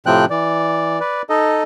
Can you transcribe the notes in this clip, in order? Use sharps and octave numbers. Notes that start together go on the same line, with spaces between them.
A2 C3 F3 C4 G5 F#6
E3 D5
B4 D5
D#4 A4 D#5